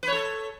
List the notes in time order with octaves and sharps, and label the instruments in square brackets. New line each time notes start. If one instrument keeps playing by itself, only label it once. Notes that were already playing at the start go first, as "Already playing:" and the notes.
[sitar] B4
C#5
A4